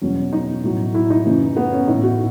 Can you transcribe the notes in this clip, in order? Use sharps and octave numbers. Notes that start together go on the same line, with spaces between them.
E2 B2 F#3 C#4
D#4
A2 F#3
E4
D#4
F#2 C#3 E3
B3
C#4
A2 E3 D#4
F#4